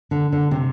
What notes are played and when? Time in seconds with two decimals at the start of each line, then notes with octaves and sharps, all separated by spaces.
0.11 D3
0.32 D3
0.51 C3